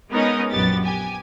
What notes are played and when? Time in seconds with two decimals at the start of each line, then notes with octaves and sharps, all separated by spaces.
0.11 G#3 B3 C#4 D#4 A#4 D#5
0.50 A#1 F#2 B3 G4 A6
0.84 G4 G#5